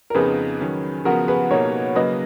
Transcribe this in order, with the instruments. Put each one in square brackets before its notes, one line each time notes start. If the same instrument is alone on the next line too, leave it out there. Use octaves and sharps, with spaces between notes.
[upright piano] A#4
[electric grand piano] F2 C#3 F3 B3 D#4 [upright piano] G#4 B4
[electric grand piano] D#3 F#3 C#4
[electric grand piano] C#3 F3 B3 [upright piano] F#4 A#4
[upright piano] G#4 B4
[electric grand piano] B2 A#3 D#4 [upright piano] A#4 C#5
[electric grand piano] C#3 F#3 A#3 [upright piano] B4 D#5